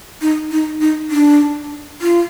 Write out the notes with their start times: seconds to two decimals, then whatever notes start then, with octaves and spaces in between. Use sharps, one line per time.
0.22 D#4
0.51 D#4
0.81 D#4
1.11 D4
2.02 F4